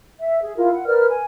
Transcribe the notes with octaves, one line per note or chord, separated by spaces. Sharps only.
E5
G#4
E4 F4 A#4
F#5
A#4 B4 D5 F6
G#5